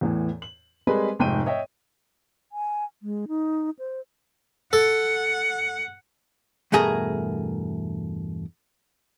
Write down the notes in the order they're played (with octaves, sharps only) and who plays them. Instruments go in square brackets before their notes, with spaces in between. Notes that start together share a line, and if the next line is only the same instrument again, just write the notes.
[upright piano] E2 A2 E3
F#7
G3 G#3 C4 G#4 A#4 B4
F1 G#2 G5 D#7
C#5 D#5 E5 G5
[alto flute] G#5
G#3
D#4
C5
[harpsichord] A4 [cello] F#5
[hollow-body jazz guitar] E2 G2 B2 A3 G#4 A#4